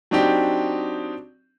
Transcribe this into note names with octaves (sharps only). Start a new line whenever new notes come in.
F#3 C4 D4 D#4 G4